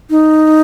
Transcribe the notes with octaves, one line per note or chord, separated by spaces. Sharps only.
D#4